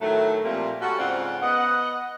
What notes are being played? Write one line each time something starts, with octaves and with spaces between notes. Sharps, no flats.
A2 D#3 F#3 A3
A#2 F3 G3 A3 A#3 C4
G3 A3 C#4 F#4
G#2 C#3 C4 F4 D5 F#5
B3 D#5 F#5